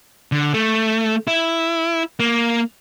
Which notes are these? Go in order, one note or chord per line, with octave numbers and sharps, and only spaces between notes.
D3
A3
E4
A#3